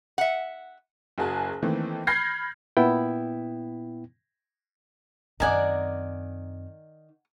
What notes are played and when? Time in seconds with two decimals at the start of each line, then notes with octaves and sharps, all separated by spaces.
0.18 E5 F#5
1.18 F#1 F#4 G#4 G#5 A5 F#6
1.63 D#3 E3 A3 A#3 C4
2.07 B5 F6 G6 G#6 A#6 C7
2.77 A#2 B3 E4 G5
5.40 F#2 D#3 C4 D5 F#5 G#5 A#5